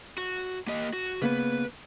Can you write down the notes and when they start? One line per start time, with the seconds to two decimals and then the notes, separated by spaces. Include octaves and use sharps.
0.18 F#4
0.67 A#3 G4 D#5
0.93 F#4
1.22 C#3 A#3 B3 B4